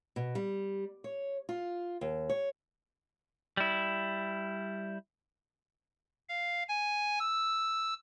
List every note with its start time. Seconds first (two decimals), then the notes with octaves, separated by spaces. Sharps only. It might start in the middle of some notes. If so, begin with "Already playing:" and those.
0.16 B2
0.35 G3
1.04 C#5
1.49 F4
2.01 D#2
2.29 C#5
3.57 G3 E4
6.29 F5
6.68 G#5
7.19 E6